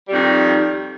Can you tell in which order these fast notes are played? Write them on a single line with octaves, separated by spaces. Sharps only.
G3 F2 D#3